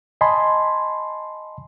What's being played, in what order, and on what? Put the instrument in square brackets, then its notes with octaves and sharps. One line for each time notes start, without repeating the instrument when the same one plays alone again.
[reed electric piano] D#5 G#5 A5 B5 C6